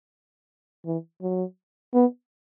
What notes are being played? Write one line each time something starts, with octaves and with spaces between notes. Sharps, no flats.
E3
F#3
B3